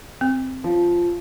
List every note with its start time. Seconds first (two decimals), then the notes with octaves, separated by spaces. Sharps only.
0.21 C4
0.64 F3